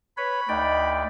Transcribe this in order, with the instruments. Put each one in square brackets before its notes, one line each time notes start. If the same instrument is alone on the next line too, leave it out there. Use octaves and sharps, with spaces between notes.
[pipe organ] B4 C#5 [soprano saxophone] B5
[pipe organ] D2 D5 G5 [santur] D#4